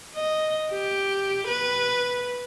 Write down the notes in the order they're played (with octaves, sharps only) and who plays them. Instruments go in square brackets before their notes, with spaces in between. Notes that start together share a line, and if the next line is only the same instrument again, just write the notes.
[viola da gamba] D#5
G4
B4